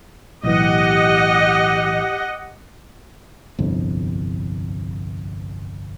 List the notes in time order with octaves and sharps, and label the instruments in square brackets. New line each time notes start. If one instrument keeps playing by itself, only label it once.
[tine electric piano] B1 A2 E3 [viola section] G4 D#5 F#5
[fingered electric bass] G1 C2 F2